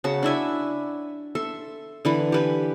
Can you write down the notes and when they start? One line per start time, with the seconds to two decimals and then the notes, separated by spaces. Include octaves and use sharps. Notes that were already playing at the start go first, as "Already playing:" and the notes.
0.04 C#3 F#4 A5
0.23 D4 E4 E5 G#5
1.35 A4 E5 C6
2.05 D3 E3 B4
2.32 G4 B4 G#5